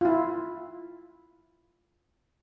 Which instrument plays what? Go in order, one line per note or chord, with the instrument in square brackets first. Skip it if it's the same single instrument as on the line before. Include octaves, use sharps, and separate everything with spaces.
[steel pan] E4 F4